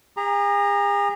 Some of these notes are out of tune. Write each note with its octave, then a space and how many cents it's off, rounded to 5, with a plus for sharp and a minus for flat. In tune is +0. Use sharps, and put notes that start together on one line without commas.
G#4 -40 A#5 +0